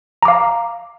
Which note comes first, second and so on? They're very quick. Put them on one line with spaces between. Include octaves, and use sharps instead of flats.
A#5 D6 F5